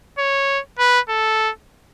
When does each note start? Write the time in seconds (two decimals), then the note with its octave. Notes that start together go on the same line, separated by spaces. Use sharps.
0.18 C#5
0.79 B4
1.09 A4